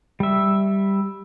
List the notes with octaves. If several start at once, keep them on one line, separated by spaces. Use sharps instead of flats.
G3 E5